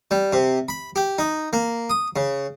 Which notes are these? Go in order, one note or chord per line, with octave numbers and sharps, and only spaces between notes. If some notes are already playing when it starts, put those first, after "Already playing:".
G3
C3
B5
G4
D#4
A#3
D#6
C#3